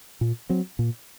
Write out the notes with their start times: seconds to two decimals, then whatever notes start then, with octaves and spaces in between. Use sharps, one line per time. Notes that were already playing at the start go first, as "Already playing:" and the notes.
0.21 A#2
0.49 F#3 C4
0.79 A#2